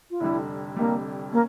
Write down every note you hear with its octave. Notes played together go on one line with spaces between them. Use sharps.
F4
F1 F2 D3 G3 E4
F1 F2 D3 G3 A#3
A#3 C#4